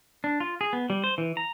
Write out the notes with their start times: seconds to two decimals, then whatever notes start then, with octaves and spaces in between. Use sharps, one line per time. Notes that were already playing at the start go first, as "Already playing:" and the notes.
0.24 D4
0.40 F4
0.61 G#4
0.73 B3
0.90 G3
1.04 C5
1.18 E3
1.37 A#5